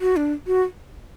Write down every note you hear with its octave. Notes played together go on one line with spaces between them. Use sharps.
F#4
D4
F#4